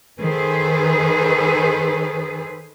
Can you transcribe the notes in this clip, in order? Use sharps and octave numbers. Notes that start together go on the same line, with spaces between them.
D#3 G#4 A4 B4 C5